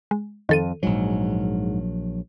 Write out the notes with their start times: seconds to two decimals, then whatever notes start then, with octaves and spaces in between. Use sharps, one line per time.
0.11 G#3
0.49 F2 D#3 A4 D#7
0.83 A#1 G#2 F#3